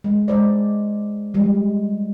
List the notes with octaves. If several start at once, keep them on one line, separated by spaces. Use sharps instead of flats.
G#3
G#3 C5 D5
F3 G3 G#3